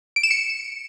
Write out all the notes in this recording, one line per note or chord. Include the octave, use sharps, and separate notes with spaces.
D7
E7
C#7